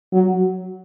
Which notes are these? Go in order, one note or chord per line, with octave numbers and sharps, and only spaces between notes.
F#3